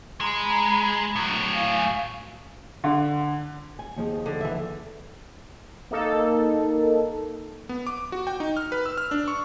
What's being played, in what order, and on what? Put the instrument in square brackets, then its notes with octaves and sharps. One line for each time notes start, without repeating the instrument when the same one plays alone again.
[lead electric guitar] G#3 [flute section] A#5 B5
[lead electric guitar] A2 F#3
[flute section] F5 G#5
[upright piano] D3
[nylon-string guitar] G#5
D#2 F3 G#4
[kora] D3
E3 E5
[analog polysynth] A#3 D#4 A4
[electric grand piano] B3
D6
F#4
G5
D#4
F6
B4
E6
F6
D4
C#6